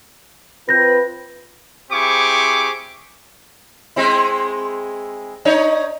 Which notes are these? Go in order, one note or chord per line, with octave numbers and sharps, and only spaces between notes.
C4 F4 B4 G6 A#6
C4 E4 G4 G#4 C#6 D6
G#3 C4 E4
D4 D#4 C#5